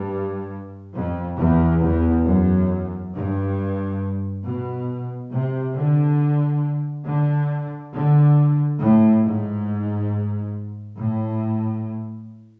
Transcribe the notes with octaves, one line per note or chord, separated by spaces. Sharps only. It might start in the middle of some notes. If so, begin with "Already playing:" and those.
Already playing: G2
F2
E2
E2
F#2
G2
B2
C3
D3
D3
D3
A2
G#2
A2